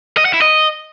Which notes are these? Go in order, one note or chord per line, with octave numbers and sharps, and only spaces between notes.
D#5
F#5
E4
D#5